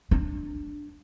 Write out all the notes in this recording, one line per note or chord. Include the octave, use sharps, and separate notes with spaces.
D4